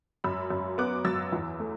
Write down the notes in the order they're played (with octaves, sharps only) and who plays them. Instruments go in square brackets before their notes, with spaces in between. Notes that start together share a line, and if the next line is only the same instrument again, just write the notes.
[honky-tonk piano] F#2 B5 E6
F#2
B3 D6 F#6
F#3 E6 A6
E2
A3